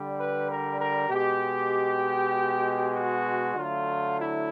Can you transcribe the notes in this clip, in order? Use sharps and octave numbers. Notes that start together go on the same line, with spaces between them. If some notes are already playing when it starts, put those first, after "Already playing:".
Already playing: D3 G3
B4
A#4
A#4
B2 G#3 G4
F#4
D3 F#3 A3 F4
E4